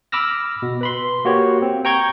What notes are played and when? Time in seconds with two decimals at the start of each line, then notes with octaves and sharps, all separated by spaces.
0.12 B5 D6 E6 F6 A#6
0.62 B2
0.81 B4 B5 C6
1.25 A#3 F#4 G4 C#5
1.62 C4
1.85 G5 A#5 C#6 G6 G#6